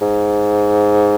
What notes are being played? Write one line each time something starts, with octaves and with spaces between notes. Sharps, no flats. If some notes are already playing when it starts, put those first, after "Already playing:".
G#2